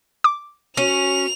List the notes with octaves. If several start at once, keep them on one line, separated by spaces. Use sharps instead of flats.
D6
C#4 F#4 F7